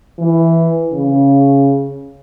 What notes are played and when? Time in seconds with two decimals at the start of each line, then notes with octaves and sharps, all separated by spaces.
0.19 E3
0.92 C#3